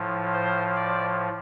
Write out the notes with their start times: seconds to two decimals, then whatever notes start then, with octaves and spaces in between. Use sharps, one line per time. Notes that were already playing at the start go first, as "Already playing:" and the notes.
Already playing: A2 F3
0.33 C5
0.76 D5